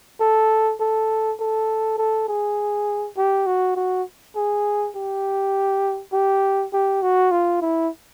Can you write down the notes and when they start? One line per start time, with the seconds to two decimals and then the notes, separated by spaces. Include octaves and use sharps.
0.21 A4
0.80 A4
1.40 A4
1.98 A4
2.28 G#4
3.17 G4
3.46 F#4
3.76 F#4
4.36 G#4
4.95 G4
6.13 G4
6.73 G4
7.02 F#4
7.31 F4
7.62 E4